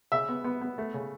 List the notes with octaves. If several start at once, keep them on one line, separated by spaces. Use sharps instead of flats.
C#3 E5
B3
B3
B3
A3
C#3